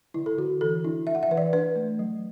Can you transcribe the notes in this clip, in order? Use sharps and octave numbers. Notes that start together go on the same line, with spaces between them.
D3 E4
A4
D3 F#4
E3 A4
D4 E4
D4 E5
F#5
E5
E3 B4
D5
D4 B4
A3
F#3